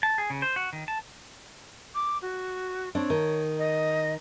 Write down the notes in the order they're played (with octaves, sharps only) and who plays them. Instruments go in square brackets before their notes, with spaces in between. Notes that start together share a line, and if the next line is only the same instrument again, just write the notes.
[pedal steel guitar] A5
G#4
C#3
C5
F#4
D#3
A5
[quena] D6
F#4
[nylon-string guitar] C4 D4 [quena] C#5
[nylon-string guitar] D#3
[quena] D#5